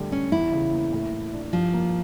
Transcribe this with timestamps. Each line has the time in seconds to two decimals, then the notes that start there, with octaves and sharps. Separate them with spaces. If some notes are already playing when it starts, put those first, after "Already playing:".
Already playing: A2 D3 G3
0.12 G3 C#4
0.32 E2 E4
0.52 C#3
0.72 A#3
0.93 A2
1.12 E3
1.33 D4
1.52 G2 F3
1.73 A#3